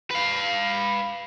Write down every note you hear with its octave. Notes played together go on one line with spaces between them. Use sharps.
B4 F5